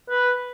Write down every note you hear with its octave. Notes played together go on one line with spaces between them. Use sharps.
B4